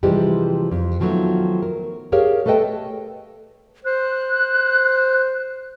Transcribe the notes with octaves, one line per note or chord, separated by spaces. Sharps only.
C3 E3 F3 G3 G#3 G4
F2
D#3 F3 F#3 A3 B3
A#4
G4 G#4 A#4 C#5 F5
A3 A4 B4 D#5 G5 A5
C5 F#6